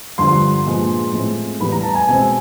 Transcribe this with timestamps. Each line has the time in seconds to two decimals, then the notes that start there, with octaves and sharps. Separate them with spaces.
0.18 G2 D3 F3 C6
0.66 A#2 F3 G#3 B3
1.13 A2 F3 G#3 C4
1.60 A2 E3 G3 B3 B5
1.72 A#5
1.83 A5
1.95 G#5
2.07 B2 G#3 C4 G#5